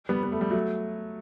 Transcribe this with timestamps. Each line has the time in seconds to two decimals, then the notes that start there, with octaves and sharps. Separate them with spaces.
0.09 G3 B3
0.23 B3
0.32 A3
0.41 G3
0.50 F#3 A3